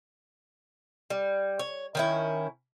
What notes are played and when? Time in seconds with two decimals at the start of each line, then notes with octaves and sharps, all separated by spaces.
1.10 G3
1.59 C#5
1.95 D#3 C#4 E4